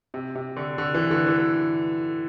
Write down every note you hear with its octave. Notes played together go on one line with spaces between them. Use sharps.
C3
C3
D3
D3
E3
D3
E3